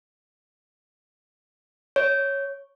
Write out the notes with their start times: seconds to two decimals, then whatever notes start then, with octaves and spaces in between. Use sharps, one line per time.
1.96 C#5